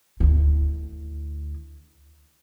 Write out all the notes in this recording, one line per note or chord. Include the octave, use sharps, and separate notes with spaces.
D2 E4